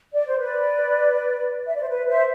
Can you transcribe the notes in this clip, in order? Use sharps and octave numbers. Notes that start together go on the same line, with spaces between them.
D5
C5
B4 D5
E5
D5
C5
B4
C5 E5